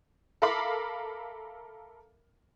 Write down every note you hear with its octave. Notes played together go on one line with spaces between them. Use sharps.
A4 A#4 E5 F5 B5 D6